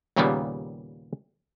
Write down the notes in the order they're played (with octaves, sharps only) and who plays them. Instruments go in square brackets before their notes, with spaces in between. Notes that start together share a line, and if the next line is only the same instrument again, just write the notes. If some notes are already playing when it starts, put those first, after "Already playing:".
[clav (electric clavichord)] D#2 A#2 C#3 G3 A#3 B3